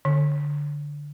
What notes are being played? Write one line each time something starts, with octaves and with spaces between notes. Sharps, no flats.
D3